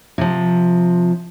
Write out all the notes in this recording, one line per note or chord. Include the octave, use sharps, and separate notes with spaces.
C3 F3